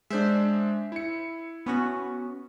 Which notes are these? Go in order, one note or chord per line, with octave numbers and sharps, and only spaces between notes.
G#3 D4 C5 E5
E4 C#7
B3 C#4 F#4